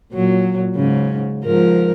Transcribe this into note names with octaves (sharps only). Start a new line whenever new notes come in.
A#2 F#3
G#2 C#3
G#2 F3 A#4